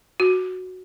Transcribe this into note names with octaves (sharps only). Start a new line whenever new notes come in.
F#4